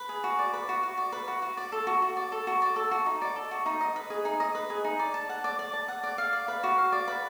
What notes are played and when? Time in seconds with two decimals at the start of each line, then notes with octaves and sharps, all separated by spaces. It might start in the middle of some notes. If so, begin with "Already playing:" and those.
Already playing: B4
0.09 G#4
0.24 F#4
0.39 D5
0.53 B4
0.69 F#4
0.83 F#4
0.98 D5
1.12 B4
1.28 F#4
1.42 F#4
1.57 D5
1.72 A4
1.87 F#4
2.02 F#4
2.17 D5
2.32 A4
2.47 F#4
2.62 D5
2.76 A4
2.91 F#4
3.06 D#4
3.22 D5
3.36 A4
3.51 F#4
3.66 D#4
3.81 D#5
3.96 B4
4.10 G#4
4.25 D#4
4.40 D#5
4.55 B4
4.70 G#4
4.85 D#4
4.99 D5
5.14 A5
5.29 F#5
5.44 D5
5.59 D5
5.74 A5
5.88 F#5
6.03 D5
6.18 F5
6.33 D5
6.48 B4
6.64 F#4
6.78 F5
6.92 D5
7.08 B4